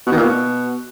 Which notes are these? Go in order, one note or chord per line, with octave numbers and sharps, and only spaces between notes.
B2
D#3
A#2
B2